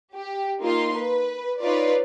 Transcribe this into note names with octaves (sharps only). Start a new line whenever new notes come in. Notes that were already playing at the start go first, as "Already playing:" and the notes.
G4
A#3 D#4 F4 C6
B4
D#4 F4 B4 C#5 D5